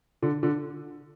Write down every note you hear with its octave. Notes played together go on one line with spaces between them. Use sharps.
D3
D3